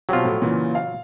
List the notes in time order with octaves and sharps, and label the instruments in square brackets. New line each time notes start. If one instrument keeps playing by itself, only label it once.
[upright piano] B2 C4 G4 [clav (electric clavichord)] F#3 F4
[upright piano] A2 F3
A#2 C#3 E3
F5